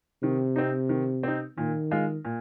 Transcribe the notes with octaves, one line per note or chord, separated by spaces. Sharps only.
C3 D#3
C4 D#4
D#3
C4 D#4
A#2 D#3
G#3 F4
A#2